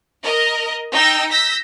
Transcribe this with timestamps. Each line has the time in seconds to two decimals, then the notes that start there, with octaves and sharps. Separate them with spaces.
0.22 A#4 D#5
0.92 D#4 G5 E6 G6 A#6
1.31 E6 G6 A#6 B6